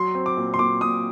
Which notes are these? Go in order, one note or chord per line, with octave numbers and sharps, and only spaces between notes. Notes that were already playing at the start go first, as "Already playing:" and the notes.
Already playing: F#3 C6
C4
D6
A#2
C6
A#2 D6
A#2 D#6